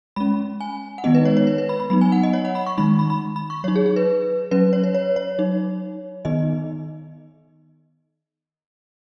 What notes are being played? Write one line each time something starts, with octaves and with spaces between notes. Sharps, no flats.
G#3 C#4 B5
G#5
F#5
D#3 G#3 B3 D#4 D#5
B4
C#5
C#5
B4
B4
B5
B5
F#3 B3 D#4 B5
G#5
F#5
D#5
C#5
F#5
B5
C#6
D#3 G#3 D#4 B5
B5
B5
B5
C#6
F#3 D#4 C#5
G#4
G#4
B4
F#3 C#4 B4
C#5
B4
C#5
C#5
F#3 D#4
D#3 B3 D#4 D#5